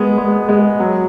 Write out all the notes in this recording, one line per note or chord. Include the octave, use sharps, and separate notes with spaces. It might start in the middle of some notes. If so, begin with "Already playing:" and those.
Already playing: G#3 B3
G#3
G#3
F#3